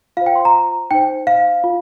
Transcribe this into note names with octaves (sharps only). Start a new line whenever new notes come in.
F4 C5 F5
G5
C6
A#5
D#4 C5 G5
F5
F4